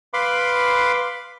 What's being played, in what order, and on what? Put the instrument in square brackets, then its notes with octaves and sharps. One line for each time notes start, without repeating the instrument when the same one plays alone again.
[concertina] B4 F5 B5 C6 D6